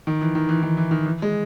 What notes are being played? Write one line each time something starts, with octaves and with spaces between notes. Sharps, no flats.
D#3
E3
D#3
E3
D#3
E3
D#3
E3
G#3